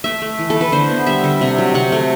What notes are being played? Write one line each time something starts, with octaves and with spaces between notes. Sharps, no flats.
A3 E5
A3
E3
A4
A3 B4
D3 C5
B3
G3 E5
D3
C3
F#3
C3 F#5
A3